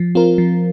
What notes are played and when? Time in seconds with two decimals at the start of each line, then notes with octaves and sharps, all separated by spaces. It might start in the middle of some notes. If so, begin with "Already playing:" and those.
Already playing: F3
0.15 C4 F4 A#4
0.38 F3